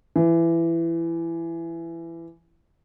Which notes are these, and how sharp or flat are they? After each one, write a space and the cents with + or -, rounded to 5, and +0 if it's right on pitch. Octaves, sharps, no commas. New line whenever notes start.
E3 +20